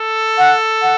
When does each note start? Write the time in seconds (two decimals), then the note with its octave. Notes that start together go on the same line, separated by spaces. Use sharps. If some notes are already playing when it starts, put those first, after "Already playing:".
Already playing: A4
0.38 F#5
0.82 F#5